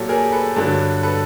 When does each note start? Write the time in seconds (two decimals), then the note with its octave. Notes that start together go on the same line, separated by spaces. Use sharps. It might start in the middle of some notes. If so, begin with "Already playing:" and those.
Already playing: A#2 F#3 G4 A4
0.09 G#4 A#4
0.32 A4 B4
0.56 G2 D3 F#3
1.03 A4 B4